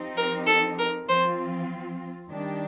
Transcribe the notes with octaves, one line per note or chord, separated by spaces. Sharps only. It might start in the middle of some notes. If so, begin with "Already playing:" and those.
Already playing: F3 C4 D#4 G4
A#4
A4
A#4
F3 C4 F4 C5
D#3 G3 D4 G4